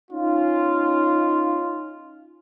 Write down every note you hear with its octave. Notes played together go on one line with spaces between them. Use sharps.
C#4 D#4 F4